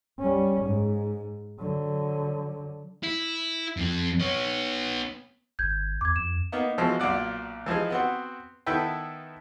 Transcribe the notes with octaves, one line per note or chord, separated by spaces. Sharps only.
G3 C#4
G#2
D3 F#3
E4
F2 C4
B3 C#5
G#1 G6 G#6
E2 D6 G#6
F2 E7
A#3 B3 D#4
B2 E3 F3 G#3
B1 A#2 F4 D5 F#5
E3 F3 D#4 G#4
B3 C4 F#4
D#3 B3 E4 A4 B4 G5